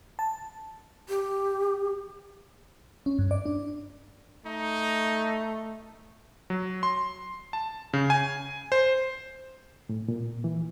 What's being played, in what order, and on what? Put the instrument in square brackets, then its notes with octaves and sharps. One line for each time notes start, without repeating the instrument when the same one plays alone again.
[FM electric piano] A5
[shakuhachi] G4
[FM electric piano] C#4
G2
D5
D4
[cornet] A3 [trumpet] D#4
[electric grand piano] F#3
C6
A5
C#3
G#5
C5
[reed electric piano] A2
A#2
E3